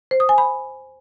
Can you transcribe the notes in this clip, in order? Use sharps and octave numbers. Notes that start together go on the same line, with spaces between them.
C5
D#6
G#5
B5